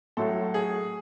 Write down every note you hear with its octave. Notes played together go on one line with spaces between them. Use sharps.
A2 F#3 A3 A4
G#4